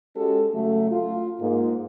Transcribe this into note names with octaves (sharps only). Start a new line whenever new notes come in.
G#3 C#4 F#4 G4 A4
C#3 F#3 A3
F4
G#2 A#3